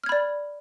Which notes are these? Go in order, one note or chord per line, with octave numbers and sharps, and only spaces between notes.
D5 B5 F6 G#6